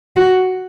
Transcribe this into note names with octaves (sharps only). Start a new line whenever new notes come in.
F#4